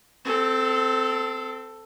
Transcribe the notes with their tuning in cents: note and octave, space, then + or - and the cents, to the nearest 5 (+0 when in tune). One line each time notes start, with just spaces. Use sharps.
C4 -15 A4 +5